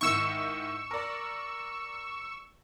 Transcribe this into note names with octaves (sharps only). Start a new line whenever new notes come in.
G#2 D#3 E4 C#6 E6
A#4 D5